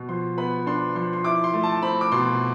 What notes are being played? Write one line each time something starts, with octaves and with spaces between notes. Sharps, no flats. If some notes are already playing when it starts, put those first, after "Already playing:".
Already playing: B2
F3 C6
B3 B5
D4 C6
F3 C6
C6
E4 D6
C6
A3
A5
C4 B5
D6
B2 C6